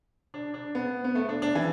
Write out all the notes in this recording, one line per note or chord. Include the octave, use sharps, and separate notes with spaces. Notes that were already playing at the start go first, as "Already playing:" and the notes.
D4
D4
B3
B3
A3
D4
D4
E3